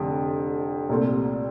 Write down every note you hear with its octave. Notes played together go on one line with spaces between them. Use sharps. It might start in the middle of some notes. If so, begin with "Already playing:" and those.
Already playing: F1 F2 D3
C2 A#2 A3 C4